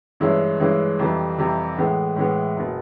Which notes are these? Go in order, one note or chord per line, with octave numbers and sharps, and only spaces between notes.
G2 E3 G#3 C#4 E4
G2 E3 G#3 C#4 E4
F2 C3 E3 G3
F2 C3 E3 G3
A2 E3 G#3 B3
A2 E3 G#3 B3
F#1 B2